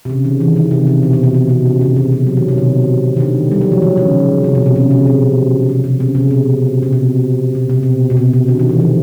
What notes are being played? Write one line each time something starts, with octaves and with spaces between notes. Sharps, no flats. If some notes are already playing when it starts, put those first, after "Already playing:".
C3
C#3
D#3
E3
D#3
C3
C3
B2
B2
C3
B2
C3
C#3
C3
B2
C3
F#3
D#3
B2
C3
D#3
D3
G3
F#3
F3
D#3
C#3
C3
B2
C3
C#3
C3
B2
C3
C3
C#3
C3
B2
B2
C3
B2
C3
B2
B2
C3
C3
D3
D#3
E3
F3